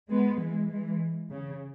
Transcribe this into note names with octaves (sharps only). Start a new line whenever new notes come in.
G#3 B3
E3 G#3
E3 G#3
C#3